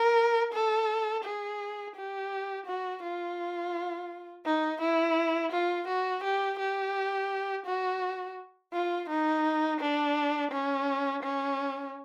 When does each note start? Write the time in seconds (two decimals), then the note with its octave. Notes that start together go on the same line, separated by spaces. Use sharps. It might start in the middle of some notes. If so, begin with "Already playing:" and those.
Already playing: A#4
0.53 A4
1.24 G#4
1.96 G4
2.67 F#4
3.03 F4
4.45 D#4
4.81 E4
5.52 F4
5.88 F#4
6.23 G4
6.59 G4
7.66 F#4
8.73 F4
9.09 D#4
9.80 D4
10.51 C#4
11.23 C#4